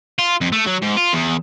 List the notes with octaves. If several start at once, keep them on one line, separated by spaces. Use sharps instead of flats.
F4
F2
A3
F#3
G#2
F4
E2